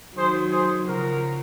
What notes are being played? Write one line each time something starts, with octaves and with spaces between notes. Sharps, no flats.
D#3 F#3 G#4 C5
G#4 C5
C#3 F3 F#4 A#4